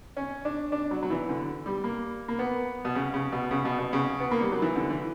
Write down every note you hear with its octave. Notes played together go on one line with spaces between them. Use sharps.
C#4
D4
D4
F#3
F#3
E3
D3
G3
A#3
A#3
B3
B2
C#3
C#3
B2
C#3
B2
B2
C#3
B3
A#3
G3
F#3
E3
D3
E3